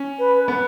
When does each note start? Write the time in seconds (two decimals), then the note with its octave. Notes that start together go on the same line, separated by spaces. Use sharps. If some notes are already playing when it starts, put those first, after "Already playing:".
Already playing: C#4
0.19 B4
0.48 B3 B4